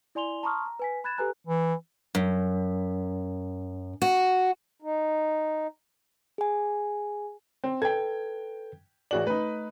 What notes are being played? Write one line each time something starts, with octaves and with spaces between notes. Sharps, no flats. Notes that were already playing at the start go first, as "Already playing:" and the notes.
E4 D5 G#5 C6 F7 G7
A5 A#5 C6 C#6 D#6 F6
A#5
B4 G#5 B6
B5 F#6 G#6 A6 E7
G4 A4 B4 G#5 A#5 F#6
E3
F#2
F#4
D#4
G#4 G#5
C4
A4 B4 G5 G#6
A1 F#4 G#4 D5 F#7
A3 D#4 B4